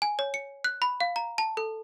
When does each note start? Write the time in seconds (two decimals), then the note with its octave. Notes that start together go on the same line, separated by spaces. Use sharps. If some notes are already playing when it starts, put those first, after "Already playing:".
0.02 G#5
0.19 C#5
0.34 C#7
0.64 F#6
0.82 B5
1.00 F5
1.16 A#5
1.38 A5
1.57 A4